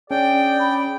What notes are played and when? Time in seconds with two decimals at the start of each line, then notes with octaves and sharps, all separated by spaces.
0.11 C#4 D4 G#4 D5 G5
0.60 B5